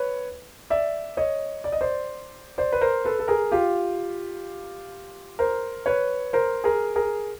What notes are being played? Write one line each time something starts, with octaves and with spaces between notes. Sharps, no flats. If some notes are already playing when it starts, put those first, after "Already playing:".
Already playing: B4 C#5
D5 E5
C#5 D#5
D5
D#5
C5 D5
C5 D5
B4
A#4 C5
A4 B4
A4
G#4 A#4
F4 G4
A#4 C5
B4 C#5
A#4 C5
G#4 A#4
G#4 A#4